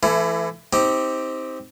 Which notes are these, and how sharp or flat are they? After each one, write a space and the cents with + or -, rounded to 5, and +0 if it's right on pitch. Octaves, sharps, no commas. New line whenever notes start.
E3 +35 A3 +0 E4 +20
C4 +0 D#4 +30 G4 +0